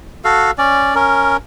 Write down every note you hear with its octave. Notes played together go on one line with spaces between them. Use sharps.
F#4 A4 F5
C#4 D5
C#4 A#4